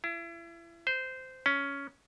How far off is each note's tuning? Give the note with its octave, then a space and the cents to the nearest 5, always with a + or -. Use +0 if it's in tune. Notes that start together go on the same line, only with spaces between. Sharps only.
E4 +35
C5 -15
C#4 +10